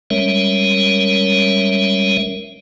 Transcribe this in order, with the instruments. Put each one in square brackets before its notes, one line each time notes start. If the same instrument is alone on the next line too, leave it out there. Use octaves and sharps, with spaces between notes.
[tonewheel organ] G3 G#3 C#4 A#4 C#5 E5